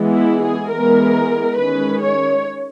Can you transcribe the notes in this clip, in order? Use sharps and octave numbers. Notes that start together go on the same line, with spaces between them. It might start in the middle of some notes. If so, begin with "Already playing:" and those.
Already playing: E3 G#3 B3
E4
G#4
E3 G#3 B3 A#4
D#3 G#3 C#4 B4
C#5